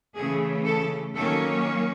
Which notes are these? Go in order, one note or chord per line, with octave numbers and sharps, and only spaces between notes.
C#3 E3 A3 G#4
A4
D#3 F#3 A#3 C#4 A4